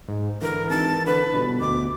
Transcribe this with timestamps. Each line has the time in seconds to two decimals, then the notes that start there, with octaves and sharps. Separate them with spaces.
0.08 G#2
0.42 D3 E3 A#4
0.70 G#1 A5
1.06 D3 B4
1.33 G1 B2
1.60 D2 B2 D6